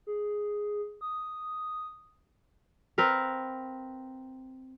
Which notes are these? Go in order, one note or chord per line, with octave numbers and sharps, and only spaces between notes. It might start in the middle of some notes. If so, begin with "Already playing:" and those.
G#4
D#6
C4 A#4 B4 F5